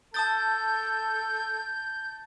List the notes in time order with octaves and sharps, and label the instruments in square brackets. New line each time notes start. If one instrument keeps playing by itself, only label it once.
[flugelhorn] A4 [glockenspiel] A5 D#6 A6 [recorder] G6